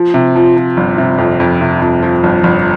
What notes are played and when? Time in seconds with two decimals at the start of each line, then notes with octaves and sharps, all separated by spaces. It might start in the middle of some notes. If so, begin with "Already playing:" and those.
Already playing: F3
0.14 C3
0.36 F3
0.56 F3
0.77 G1
0.98 C3
1.18 F2
1.40 F2
1.61 C3
1.81 F2
2.02 F3
2.23 G1
2.44 G1